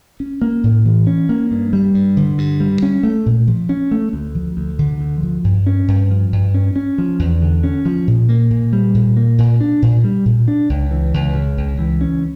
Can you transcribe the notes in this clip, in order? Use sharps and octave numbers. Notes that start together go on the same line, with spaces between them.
C#4
A#3
A2
E3
C#4
A#3
G2
G3
G2
D3
G2
G3
C#4
A3
A#2
F3
C#4
A3
D2
F3
D2
D3
D2
F3
G2
C#4
G2
F3
G2
C#4
C#4
F3
E2
D3
C#4
F3
A#2
A#3
A#2
G3
A#2
A#3
A#2
D4
A#2
G3
A#2
D4
C#2
E3
C#2
C#3
C#2
E3
C#4